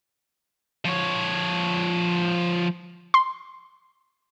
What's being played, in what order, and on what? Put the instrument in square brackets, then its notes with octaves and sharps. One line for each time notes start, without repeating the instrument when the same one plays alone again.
[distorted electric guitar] F3 C#5
[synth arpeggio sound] C6